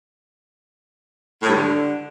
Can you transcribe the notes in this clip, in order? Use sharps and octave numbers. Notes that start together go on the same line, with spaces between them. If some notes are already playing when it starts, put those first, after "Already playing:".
A2
G2
D3